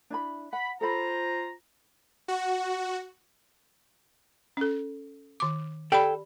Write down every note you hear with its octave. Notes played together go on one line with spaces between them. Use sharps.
D4 E4 B5
F#5 B5
F4 A4 C5 A#5 B5
F#4 F#5
C#4 A4
D#3 D6
G4 A4 D5 G5 B5